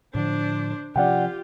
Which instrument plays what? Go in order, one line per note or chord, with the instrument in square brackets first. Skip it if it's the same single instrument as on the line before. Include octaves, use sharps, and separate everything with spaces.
[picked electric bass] A2 D3 F3 [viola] D4 C5
[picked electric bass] C3 F3 C#4 [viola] F4 G4 [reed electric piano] D5 F#5 G5